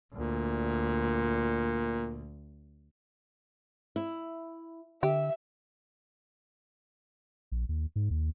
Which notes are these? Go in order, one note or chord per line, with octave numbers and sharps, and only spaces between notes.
D2 A#2
E4
D3 G4 E5
A#1
D#2
G#2
D#2